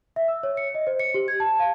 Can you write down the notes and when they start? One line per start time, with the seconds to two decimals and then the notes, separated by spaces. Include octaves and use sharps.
0.16 E5
0.28 E6
0.43 C#5
0.57 C#7
0.75 D#5
0.87 C5
1.00 C#7
1.14 G4
1.28 G#6
1.40 A5
1.60 F5